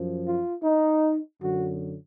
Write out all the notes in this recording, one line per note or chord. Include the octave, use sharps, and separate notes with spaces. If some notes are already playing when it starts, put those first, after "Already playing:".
Already playing: F#2 F3
F4
D#4
F#2 D3 F#3 F#4